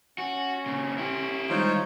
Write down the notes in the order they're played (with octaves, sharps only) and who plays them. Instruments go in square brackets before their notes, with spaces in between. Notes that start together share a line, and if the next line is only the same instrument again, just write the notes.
[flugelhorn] C#4 [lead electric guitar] F#4 [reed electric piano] G#5
[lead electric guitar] A#2 C#3
E4 G4
[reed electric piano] D#3 G3 G#3 [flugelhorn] D#4 [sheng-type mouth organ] F4 C5 C#5